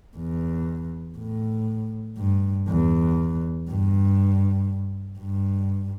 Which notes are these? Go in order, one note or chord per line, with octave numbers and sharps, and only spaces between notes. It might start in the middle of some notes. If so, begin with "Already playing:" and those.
E2
A2
G2
E2
G2
G2